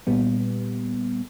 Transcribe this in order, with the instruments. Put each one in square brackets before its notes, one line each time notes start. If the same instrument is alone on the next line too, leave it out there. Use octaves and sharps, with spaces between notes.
[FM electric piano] A#2 G3 B3